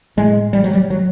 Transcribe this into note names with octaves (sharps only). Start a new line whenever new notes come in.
A2 G#3
G3
F#3
G3
F#3